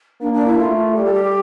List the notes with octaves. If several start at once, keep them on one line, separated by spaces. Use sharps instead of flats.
A#3 D4
D4
E4
A3 F4
G3 G4
A4
G4